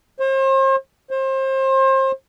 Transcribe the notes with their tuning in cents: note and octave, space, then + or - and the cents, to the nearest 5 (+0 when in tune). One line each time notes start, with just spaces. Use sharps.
C5 +40
C5 +30